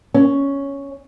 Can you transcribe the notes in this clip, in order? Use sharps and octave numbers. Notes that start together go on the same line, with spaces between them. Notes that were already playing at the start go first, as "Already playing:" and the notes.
C#4